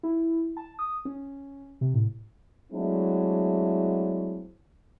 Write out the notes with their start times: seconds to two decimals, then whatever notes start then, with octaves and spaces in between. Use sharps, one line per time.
0.03 E4
0.57 A5
0.79 D#6
1.05 C#4
1.81 C3
1.94 A2
2.72 F#3 G#3 A3 C4 D4 E4